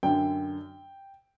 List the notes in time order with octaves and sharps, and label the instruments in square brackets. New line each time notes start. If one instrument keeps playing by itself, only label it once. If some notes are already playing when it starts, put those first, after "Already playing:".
[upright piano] F#2 D3 G5